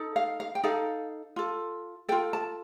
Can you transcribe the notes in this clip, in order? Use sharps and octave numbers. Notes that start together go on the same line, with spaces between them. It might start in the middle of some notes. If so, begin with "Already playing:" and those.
Already playing: D#4 A4
F5
F5
G5
D#4 A4 F5
F4 A4
F4 A4 G5
A5